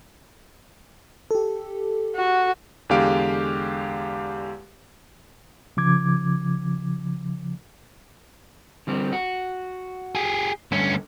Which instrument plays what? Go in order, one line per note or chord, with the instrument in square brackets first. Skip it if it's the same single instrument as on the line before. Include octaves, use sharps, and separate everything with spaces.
[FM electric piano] G4 A4
[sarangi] F#4
[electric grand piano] E2 D3 G#3 G4 F5 D7
[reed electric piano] C#3 F3 D6 G#6
[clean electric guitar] D3 G3 C4
F#4
[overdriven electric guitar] G4 G#4
[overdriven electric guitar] D2 C#4 [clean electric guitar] G2 D3